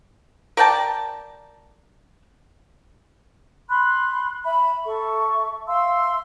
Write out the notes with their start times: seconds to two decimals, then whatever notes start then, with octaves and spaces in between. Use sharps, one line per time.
0.57 A#4 D5 G5 A5
3.69 B5 C6 F#6
4.45 E5 B5
4.85 A4 E5 C#6
5.68 E5 F5 C6 E6